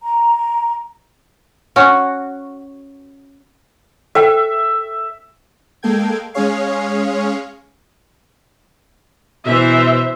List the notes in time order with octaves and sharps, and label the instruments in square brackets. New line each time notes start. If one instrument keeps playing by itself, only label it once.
[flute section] A#5
[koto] C#4 F#4
[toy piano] A4 C5 G5 [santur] E5
[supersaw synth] G#3 A#3 A4 G5 G#6
G#3 C#4 G#4 C#5 F5
[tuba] B2 [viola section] E3 C5 E5